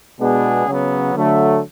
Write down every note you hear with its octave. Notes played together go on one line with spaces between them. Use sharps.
B2 G#3 B3 D4 G#4
C#3 F#3 B3
D3 F#3 A3